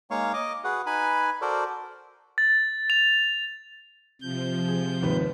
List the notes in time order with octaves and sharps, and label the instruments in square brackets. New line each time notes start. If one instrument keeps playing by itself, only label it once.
[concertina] G#3 A#3 D#4 C#5 F5 C#6
D#5 D6
F#4 G#4 B4 F#5
D#4 B4 G#5 B5
F#4 A4 A#4 C5 D5
[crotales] A6
F7
[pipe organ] C3 G6 [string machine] F3
[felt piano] G#4
D#2 G#2 B4